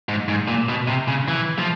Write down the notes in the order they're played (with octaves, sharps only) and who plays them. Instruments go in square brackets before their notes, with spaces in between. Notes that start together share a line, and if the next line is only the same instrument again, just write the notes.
[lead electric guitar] G#2
G#2
A#2
B2
C3
C#3
E3
F3